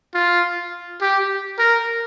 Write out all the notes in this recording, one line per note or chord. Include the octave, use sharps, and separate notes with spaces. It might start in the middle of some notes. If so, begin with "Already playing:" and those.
F4
G4
A#4